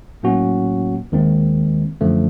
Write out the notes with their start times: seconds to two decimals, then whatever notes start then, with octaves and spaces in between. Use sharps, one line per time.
0.23 A2 F#3 A#3 C#4 F#4
1.12 D#2 D#3 G#3 C4
2.01 F#2 D3 F3 A3